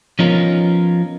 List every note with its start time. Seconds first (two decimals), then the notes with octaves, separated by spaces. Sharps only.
0.19 F3 B3 C#4 D#4 F4 A#4